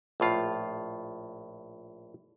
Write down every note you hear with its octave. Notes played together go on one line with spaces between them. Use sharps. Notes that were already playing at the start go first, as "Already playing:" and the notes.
A#1 A2 F4